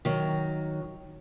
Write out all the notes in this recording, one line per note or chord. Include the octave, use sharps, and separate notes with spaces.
D#3 F#3